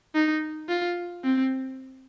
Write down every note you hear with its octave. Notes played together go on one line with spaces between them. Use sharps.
D#4
F4
C4